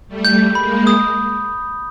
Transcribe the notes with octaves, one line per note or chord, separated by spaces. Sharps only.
G3 A3
G6
G#3 A#3 B5
D#6